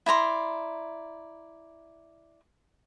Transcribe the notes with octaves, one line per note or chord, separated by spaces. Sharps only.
E4 D5 A#5 C6